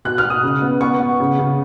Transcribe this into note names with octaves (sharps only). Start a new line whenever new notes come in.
B2 F#6
F6
B2
D#6
C#3
B3
B3 C#6
B3
C#3
C#3